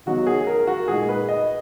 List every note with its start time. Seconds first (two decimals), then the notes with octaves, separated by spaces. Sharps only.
0.06 C#3 F#3 B3 D#4 F#4
0.27 G#4
0.47 A#4
0.67 F#4
0.88 A#2 G#3 D#4 G#4
1.09 B4
1.29 D#5